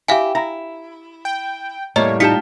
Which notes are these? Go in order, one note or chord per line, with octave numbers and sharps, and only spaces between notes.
E4 G4 E5 F5 G#5
E4 A#5
G5
A2 G3 A3 A#3 C#5 D#5
D#4 F4 G4 A5 B6 C#7